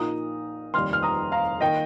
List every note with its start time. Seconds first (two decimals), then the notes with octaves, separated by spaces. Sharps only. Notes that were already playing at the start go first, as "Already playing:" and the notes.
Already playing: A#1 A#2 A#3 D#4 A#5 D#6
0.74 F1 D#2 D#3 G3 C6 F6
0.93 F6
1.03 A#5 D#6
1.32 F5 A#5
1.61 D#3 A#3 D#5 G5